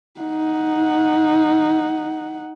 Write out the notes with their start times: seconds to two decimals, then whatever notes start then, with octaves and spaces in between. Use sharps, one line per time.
0.20 D#4 F#5